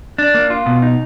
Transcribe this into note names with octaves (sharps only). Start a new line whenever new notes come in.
D4
A#3
F4
B2
D#4